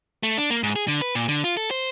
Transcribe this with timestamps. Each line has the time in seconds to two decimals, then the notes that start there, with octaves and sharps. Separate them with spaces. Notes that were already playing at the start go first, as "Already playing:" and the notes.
0.23 A3
0.38 D4
0.50 A#3
0.63 G#2
0.76 G#4
0.88 D3
1.02 B4
1.15 A#2
1.29 D3
1.44 F4
1.57 A4
1.71 C5